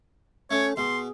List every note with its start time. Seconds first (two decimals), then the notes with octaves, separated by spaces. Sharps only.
0.51 A3 C#4 C#5
0.77 B2 G#4 C6